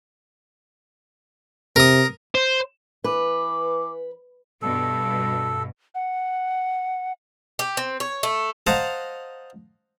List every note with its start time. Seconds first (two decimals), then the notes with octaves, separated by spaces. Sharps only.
1.76 C3 A#4 D#6
2.35 C5
3.04 E3 B4 D6
4.62 G2 B2 A4
5.95 F#5
7.59 G4
7.77 C4
8.00 C#5
8.23 A3
8.67 C5 D#5 F5 F#5 A5 A#5